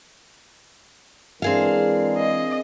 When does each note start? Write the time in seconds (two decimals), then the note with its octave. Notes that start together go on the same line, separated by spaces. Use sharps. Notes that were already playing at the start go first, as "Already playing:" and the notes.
1.42 E3 G#3 C4 D4 G#4 A#4 F5
2.18 D#5